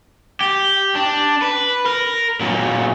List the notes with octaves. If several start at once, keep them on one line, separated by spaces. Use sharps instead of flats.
G4
D4
B4
A#4
A#2 F#3